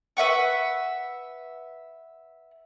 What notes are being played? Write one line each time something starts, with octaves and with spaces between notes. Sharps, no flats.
B4 E5 F#5 C#6